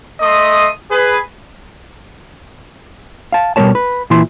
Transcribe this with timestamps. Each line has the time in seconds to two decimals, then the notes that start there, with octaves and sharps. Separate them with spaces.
0.20 A3 D#5 C6 D#6
0.90 G#4 B4
3.32 F5 A5
3.56 B2 G3 G#3 A#4 C#5 A5
3.75 B4
4.10 A#2 E3 E4 C6